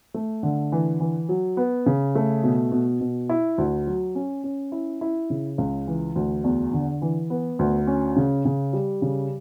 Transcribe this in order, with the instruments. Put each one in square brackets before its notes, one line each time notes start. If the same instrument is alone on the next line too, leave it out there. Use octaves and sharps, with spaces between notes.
[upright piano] A3
D3
E3
E3
F#3
B3
C#3
A3
B2
B2
B2
E4
D2
F#3
C#4
C#4
E4
E4
C#3
C#2
E3
D2
E2
D3
E3
B3
D2
C#4
C#3
C#3
G3
C#3